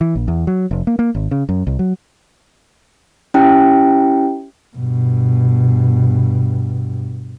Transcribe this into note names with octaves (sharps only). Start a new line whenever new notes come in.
E3
A#1
E2
F#3
F1
A#3
A#3
G#1
C#3
F#2
C2
F#3
C#4 E4 G4 G5
G2 B2